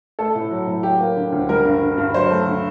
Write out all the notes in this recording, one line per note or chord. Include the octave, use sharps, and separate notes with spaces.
A3 A4
A2
F#3
A2
F#3 G4
A#3
D3
D2
G3 A#4
G2
D3
G2
F#3 C5
A3
D3